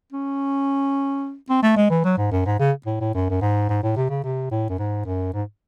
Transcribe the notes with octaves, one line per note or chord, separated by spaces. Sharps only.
C#4
C4
A3
G#3
E3
F#3
G#2
F#2
G#2
C#3
A2
A2
F#2
F#2
G#2
G#2
A2
C3
C#3
C3
A2
F#2
G#2
F#2
G#2